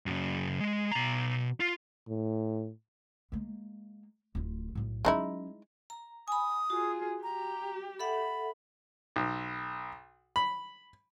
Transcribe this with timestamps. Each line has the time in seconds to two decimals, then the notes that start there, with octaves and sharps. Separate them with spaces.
0.06 F#2 C#3
0.60 G#3
0.91 B2 A#5
1.60 F4
2.09 A2
3.32 G#3 A#3
4.35 D1 F4
4.75 B1 A2
5.05 F#3 G#3 C#4 D#4 E4
5.90 A#5
6.28 G#5 B5 D#6
6.70 F4 F#4 G#4
7.23 G4 A#5
7.99 A4 E5 F#5 B5
9.16 B1
10.36 B5